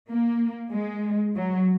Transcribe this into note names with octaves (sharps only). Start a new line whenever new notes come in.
A#3
G#3
F#3